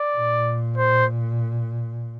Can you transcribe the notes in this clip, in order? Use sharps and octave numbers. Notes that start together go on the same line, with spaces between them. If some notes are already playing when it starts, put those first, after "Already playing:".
Already playing: D5
A#2
C5